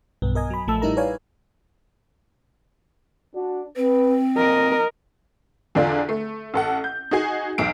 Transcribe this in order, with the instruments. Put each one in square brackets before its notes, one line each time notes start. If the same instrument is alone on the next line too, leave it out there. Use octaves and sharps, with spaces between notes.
[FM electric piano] B1 G2 B3
A#4 D#5 G#5
F#3 B5
A1 F3 A3 A5 E6
A2 G3 D#4 E4 A#4 A#5
B4 C#5 D5 F5 G#5
[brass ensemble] D4 F#4
[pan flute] C4 [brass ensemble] B4
[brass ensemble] F2 A#2 [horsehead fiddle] A#4 D#5
[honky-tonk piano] E2 D3 D4 F4
A3
A1 A4 F#5
G6
D#4 F#4 G#4 G#5
B1 E2 D7